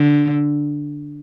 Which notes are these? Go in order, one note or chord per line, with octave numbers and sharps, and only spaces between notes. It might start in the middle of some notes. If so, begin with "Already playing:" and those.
Already playing: D3